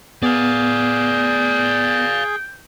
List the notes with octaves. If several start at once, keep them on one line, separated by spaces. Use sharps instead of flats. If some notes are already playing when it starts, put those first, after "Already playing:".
B3 G#4 D5 F5 G5